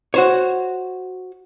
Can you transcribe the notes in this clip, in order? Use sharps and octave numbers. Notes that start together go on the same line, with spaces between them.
F#4 C5 C#5